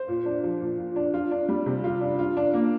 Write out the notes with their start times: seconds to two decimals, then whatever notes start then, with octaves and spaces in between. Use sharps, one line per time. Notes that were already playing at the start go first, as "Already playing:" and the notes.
Already playing: C5
0.08 A#2
0.26 D4
0.43 F3
0.61 A#2
0.78 A#2
0.96 D4
1.14 F4
1.31 D4
1.49 G3
1.66 C3
1.84 F4
2.01 D4
2.19 F4
2.37 D4
2.54 A#3